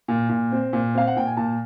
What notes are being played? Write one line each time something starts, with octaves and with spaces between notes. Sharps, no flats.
A#2
A#2
C4
A#2
C4 F5
F#5
A#2 G5
G#5
A#2 A5